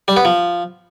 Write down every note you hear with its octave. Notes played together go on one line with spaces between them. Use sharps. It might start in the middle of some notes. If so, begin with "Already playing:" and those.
G3
B3
F3